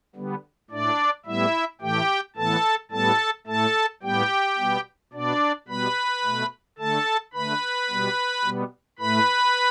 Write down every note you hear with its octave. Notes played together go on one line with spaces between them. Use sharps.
D3 G3 B3
A2 A3 D4 D5
A2 G3 B3 E4 E5
A2 E3 A3 G4 G5
A2 E3 B3 A4 A5
A2 G3 B3 A4 A5
A2 A3 A4 A5
A2 G3 B3 G4 G5
B2 G3 B3
B2 B3 D4 D5
B2 G3 B3 B4 B5
B2 A3
D3 A3 A4 A5
D3 A3 B4 B5
B2 G3 B3
B2 G3 B3
A2 A3 B4 B5